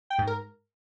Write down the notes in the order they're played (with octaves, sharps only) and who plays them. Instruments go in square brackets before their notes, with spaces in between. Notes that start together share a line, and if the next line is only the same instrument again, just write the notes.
[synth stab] G5
G#2
A#4